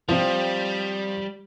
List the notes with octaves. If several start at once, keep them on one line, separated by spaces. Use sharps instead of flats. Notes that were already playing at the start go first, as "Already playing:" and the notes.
F3 G3 C4